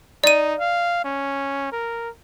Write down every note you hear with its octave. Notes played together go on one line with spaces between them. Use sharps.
D#4 D5 D#7
F5
C#4
A#4